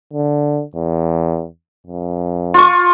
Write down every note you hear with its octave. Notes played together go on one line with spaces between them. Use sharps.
D3
E2
F2
F4 C#6